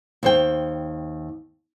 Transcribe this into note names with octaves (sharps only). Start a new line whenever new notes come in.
D#2 C5 G5